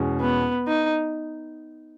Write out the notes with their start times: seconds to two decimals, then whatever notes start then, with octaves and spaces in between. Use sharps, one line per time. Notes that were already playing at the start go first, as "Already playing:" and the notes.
Already playing: E2 B2 G#3 C#4
0.21 B3
0.68 D#4